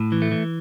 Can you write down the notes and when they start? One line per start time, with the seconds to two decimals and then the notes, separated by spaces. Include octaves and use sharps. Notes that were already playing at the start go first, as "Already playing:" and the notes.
Already playing: A2
0.12 E3
0.22 A3
0.31 E3